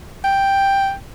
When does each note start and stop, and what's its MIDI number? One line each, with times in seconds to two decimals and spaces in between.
0.24 0.93 79